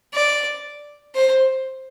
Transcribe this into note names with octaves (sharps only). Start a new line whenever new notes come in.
D5
C5